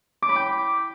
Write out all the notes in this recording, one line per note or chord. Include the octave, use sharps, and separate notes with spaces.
D6
B5
G5